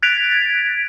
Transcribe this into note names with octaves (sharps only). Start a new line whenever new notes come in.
F#6 G#6 A6 B6 D7 F7